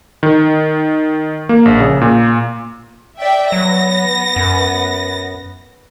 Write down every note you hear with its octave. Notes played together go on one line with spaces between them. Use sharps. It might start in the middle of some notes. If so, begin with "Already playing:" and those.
D#3
A#3
A#1
C#3
A#2
D5 E5 G5
F#3 B3 A#6
F#2